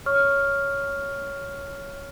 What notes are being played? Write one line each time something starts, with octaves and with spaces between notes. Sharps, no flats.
C#5 C#6 F6